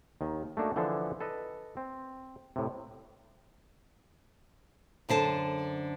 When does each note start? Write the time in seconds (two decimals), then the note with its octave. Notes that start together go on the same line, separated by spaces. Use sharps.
0.21 D#2 D#3
0.57 A3 A#3 D4 D#4 F#4
0.76 D3 E3 F3 D4 G#4 A4
1.20 A4 B4 D#5
1.77 C4
2.56 A2 C3
5.09 F#2 D3 C5 A5